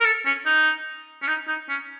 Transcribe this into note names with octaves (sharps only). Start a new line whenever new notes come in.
A#4
A4
C#4
D#4
C#4
D#4
D#4
C#4